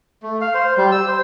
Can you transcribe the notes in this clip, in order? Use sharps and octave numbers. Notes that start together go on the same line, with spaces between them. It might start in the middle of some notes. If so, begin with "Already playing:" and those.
A3
F5
C5
G3
E6
C5